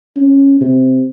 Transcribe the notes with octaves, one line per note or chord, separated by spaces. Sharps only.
C#4
C3